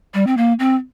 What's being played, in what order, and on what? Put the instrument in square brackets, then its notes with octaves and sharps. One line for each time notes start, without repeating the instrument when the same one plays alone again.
[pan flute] G3
C4
A#3
C4